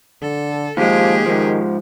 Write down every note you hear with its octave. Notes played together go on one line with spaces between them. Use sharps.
D3 A4
D#2 F3 G#3 G4 G#4
G#2 D#3 F3